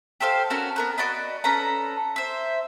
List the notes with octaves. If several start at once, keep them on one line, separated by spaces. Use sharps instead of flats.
G4 A4 C5 F5
C#4 F#4 A4 A#4
B3 A#4 F#6
F#4 D5 D#5 B5
C#4 A4 B4 A#5
C5 E5